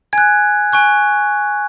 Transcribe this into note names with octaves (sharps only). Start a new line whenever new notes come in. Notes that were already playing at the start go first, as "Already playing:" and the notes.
G#5 F#6 G#6
G#5 C#6 F#6